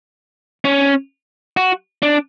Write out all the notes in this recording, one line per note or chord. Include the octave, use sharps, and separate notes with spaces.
C#4
F#4
D4